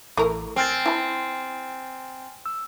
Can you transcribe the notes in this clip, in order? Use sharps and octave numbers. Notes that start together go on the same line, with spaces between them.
A1 A3 E4 A#4
C4 G#5 F6 A6
E4 A5
E6